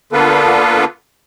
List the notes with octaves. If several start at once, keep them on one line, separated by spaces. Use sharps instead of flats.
D3 A#3 B3 F4 A4 B4